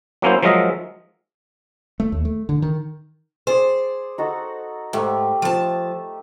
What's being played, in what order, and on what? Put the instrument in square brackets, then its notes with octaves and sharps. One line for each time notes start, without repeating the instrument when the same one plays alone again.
[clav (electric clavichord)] F#3 A#3 C#4 E4 C5
F3 F#3 G#3 A#4 D#5 E5
[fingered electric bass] A3
D#2
A3
D3
D#3
[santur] G#4 D5 [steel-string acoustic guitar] C5
[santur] D#4 F#4 A4
[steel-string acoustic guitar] G#2 [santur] A3 G4
[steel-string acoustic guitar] F3 A5